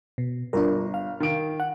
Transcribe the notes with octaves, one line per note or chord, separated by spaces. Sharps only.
B2
G1 D4 F4 A#4
F5
D#3 D7
F#5